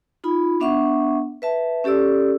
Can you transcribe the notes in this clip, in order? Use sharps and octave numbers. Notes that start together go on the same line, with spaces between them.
D#4 F4 B5
B3 D4 E5 F#5 C#6
B4 E5 A5
C#4 G4 A4 D5 E6